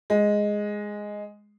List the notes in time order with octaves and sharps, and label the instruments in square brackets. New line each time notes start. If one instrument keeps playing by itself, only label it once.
[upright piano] G#3